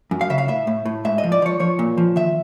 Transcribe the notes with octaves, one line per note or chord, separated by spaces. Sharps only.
F#2
F5
C#3 E5
F5
A2 E5
A2
A2
G#2 E5
D#5
F3
D5
F3 C#5
F3 C#5
A#2
F3
D#3 E5